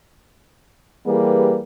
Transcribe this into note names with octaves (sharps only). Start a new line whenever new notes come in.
E3 G3 A#3 G4 G#4 B4